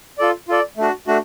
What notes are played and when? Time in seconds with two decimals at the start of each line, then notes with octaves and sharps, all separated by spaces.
0.18 F4 A4 D5
0.48 F4 A4 D5
0.77 A3 D4 F#4
1.07 A3 D4 F#4